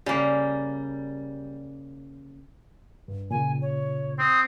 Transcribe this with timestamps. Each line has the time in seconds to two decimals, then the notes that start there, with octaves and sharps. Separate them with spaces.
0.06 C#3 G3 A#3
3.08 G2
3.31 A#2 C#3 G#5
3.61 C#5
4.19 C4 D#6